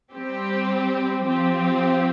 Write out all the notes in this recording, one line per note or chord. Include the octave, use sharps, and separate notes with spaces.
G3 C4 G4
F3 C4 G4